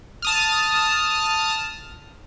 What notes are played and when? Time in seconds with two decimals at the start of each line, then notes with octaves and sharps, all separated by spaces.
0.22 A5 D#6 F6